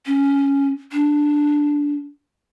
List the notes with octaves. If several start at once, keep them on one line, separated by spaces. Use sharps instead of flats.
C#4
D4